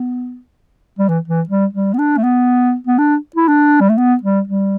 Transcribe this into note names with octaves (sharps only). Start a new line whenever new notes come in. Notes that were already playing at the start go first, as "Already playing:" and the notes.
Already playing: B3
G3
E3
E3
G3
G3
B3
D4
A3
B3
B3
D4
E4
D4
G3
A3
B3
G3
G3